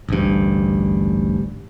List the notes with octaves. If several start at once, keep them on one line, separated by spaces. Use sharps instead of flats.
A1 D2 G2